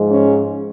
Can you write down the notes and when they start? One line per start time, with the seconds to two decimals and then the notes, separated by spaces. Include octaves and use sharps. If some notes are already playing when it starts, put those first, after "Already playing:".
Already playing: G#2 F3 G#3
0.11 C#4